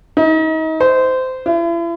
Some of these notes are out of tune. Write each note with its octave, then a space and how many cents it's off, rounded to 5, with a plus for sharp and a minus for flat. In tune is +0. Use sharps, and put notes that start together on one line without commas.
D#4 +35
C5 -20
E4 +40